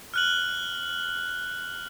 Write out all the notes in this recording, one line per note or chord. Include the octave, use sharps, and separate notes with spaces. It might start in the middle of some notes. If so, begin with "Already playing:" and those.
F6 F#6 F#7